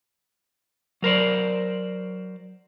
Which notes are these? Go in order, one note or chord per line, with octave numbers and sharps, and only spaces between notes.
F#3 A#4 C5 D5